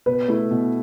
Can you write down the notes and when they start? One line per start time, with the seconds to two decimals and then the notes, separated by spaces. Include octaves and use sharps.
0.06 B2 B4
0.28 A3 E4
0.51 B2